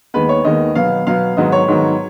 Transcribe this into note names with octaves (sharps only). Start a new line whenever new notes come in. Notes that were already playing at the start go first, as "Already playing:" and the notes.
D#2 D#3 G#3 B3 B4
C#5
D#2 D#3 G#3 B3 D#5
B2 F#3 B3 F5
B2 F#3 B3 F5
G#2 D#3 F#3 B3 D#5
C#5
G#2 D#3 F#3 B3